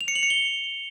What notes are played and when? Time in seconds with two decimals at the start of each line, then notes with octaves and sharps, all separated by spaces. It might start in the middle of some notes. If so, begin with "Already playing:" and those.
0.01 F7
0.08 C#7
0.15 F#7
0.23 C#7
0.30 G7